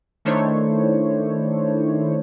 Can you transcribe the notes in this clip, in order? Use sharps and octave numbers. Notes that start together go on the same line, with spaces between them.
D#3 A3 D4 E4 C5 C#5